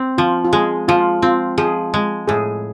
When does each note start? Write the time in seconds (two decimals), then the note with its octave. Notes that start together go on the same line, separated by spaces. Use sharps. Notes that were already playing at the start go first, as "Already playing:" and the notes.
Already playing: C4
0.18 F3 F4
0.45 F4
0.53 G#3 G#4
0.88 F3 F4
1.22 C4 F4
1.58 F3 G#4
1.94 G#3
2.28 A2 G#4